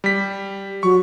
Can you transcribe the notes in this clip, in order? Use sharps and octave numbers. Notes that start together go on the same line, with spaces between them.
G3 B6
F#3 C#6